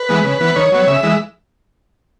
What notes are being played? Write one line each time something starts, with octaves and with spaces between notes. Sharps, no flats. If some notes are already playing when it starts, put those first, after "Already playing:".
Already playing: B4
E3 G#3 B3
C#3
E3 B3
D#3 C#5
F#3 B3
C#3 E5
E3 G#3